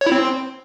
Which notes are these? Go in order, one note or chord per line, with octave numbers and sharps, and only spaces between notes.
C#5
E4
C4